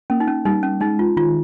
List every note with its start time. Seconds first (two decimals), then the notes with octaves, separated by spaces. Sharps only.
0.10 A#3 C#4
0.20 D#4
0.28 C#4
0.45 G3 D#4
0.63 C#4
0.81 G#3 D#4
0.99 F4
1.17 D#3 F4